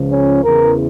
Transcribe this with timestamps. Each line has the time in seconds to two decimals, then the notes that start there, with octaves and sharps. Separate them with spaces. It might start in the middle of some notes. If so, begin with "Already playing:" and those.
Already playing: C#2 C#3 F3
0.11 C#4
0.43 E2 C#3 E3 A#4